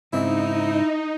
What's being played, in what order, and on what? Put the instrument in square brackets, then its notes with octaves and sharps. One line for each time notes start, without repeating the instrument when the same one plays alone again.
[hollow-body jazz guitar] G#2 C#3 C4 [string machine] D#4 [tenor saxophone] E4